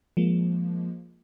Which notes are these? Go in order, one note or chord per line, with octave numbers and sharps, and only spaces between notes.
F3 G#3 A#3